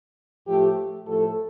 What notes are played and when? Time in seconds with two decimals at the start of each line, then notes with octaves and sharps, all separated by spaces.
0.47 A2 F3 A3 G4
1.06 A2 F3 A3 A4